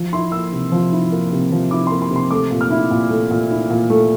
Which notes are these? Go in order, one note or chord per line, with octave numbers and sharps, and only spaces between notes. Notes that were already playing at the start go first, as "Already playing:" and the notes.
Already playing: F3
E4 C6
A#3 E6
C3
F3
E4
A#3
C3
F3
E4 D6
C6
A#3
C6
C3
C6
A3 D6
A#2
F6
E4
A#2
A3
A#2
E4
A#2
A3